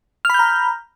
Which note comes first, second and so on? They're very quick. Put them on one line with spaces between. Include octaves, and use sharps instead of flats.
F6 B5 G6 A#5